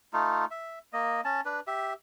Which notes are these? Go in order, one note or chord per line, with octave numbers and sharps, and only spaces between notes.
A3 D#4 F4
E5
A#3 D#5
C#4 A5
D4 B4
G4 E5